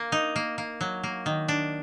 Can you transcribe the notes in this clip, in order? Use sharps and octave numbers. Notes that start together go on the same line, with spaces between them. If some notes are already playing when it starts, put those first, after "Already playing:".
Already playing: A#3
D#4
A#3
A#3
F#3
A#3
D#3
D4